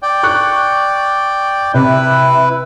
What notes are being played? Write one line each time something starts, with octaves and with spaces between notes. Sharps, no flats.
D5 G5
C#6 F#6
C3 E4 B4